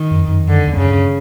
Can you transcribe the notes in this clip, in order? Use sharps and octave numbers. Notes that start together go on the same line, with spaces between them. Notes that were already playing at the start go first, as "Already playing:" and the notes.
Already playing: D#3
F#2
F2
F#2
F2
F#2 D3
F2
E2
F#2 C#3
G2